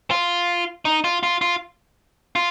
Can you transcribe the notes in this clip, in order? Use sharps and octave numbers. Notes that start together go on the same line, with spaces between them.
F4
D#4
F4
F4
F4
F4